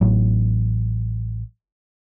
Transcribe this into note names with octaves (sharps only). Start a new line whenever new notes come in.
A1 F#3